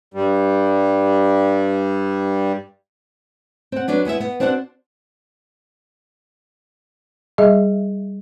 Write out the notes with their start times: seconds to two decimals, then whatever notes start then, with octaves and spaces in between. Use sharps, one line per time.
0.14 G2 G3
3.72 C4 F#5
3.88 F#3 D4 F#4 B4
4.05 G#3 B3 E4 E5
4.20 B3
4.40 C4 D4 F#4 C5 E5 F#5
7.38 G3 G#4 D#5 E5